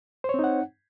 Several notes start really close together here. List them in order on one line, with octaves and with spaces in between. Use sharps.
C5 C#5 C4 D#4 F#5